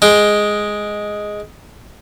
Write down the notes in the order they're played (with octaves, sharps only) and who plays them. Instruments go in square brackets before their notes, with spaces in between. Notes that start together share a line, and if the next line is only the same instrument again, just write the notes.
[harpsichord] G#3 G5